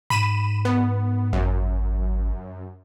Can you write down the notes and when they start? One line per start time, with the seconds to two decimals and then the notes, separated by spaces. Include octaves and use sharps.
0.10 G#2 B5 D#7 E7
0.65 B3
1.33 G#1 F#2